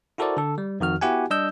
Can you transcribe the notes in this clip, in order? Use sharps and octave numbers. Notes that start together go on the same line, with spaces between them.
E4 F#4 A4 A#4 C5 D5
D3 A4
G3
F2 D#3 F#4 F6
B3 E4 F#4 G4 F#5 G#5
G3 D4 D#5 E6 G6